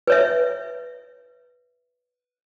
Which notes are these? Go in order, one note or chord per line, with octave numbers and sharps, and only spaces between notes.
B4 C#5 E5